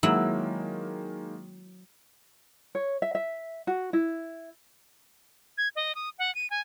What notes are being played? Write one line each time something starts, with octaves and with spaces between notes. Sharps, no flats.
D#3 F#3 G#3 A#3 E4
C#5
E5
E5
F#4
E4
G#6
D#5
D#6
F#5
D#7
G#5